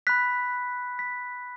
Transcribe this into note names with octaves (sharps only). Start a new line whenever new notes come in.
B5 F#6 B6
B6